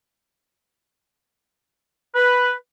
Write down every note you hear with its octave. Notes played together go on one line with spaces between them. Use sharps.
B4